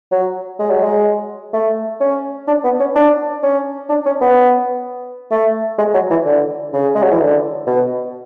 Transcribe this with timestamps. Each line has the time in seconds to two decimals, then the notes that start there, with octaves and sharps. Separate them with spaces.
0.11 F#3
0.59 G#3
0.71 F#3
0.83 G#3
1.53 A3
2.00 C#4
2.47 D4
2.64 B3
2.80 C#4
2.95 D4
3.43 C#4
3.89 D4
4.05 C#4
4.21 B3
5.31 A3
5.78 G#3
5.94 F#3
6.10 E3
6.25 D3
6.73 C#3
6.95 G#3
7.03 F#3
7.12 E3
7.21 D3
7.67 B2